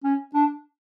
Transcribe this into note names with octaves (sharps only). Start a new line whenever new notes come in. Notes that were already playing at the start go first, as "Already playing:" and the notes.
C#4
D4